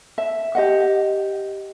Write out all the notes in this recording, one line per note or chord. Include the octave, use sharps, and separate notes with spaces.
E5
G4 D#5 F#5